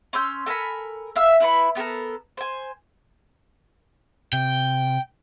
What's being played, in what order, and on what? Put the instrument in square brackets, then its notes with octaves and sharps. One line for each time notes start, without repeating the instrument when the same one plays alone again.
[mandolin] C#4 C6 E6 G6
A4 A#4 G#5 B5
E5 F5 E6
E4 B4 B5 C#6
B3 G4 A4 A#4
C5 G#5
[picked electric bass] C3 [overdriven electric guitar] G5